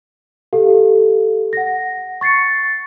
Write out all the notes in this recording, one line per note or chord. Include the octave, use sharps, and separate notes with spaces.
G4 A4 F5
F#5 A#6
C#6 A6 C7 C#7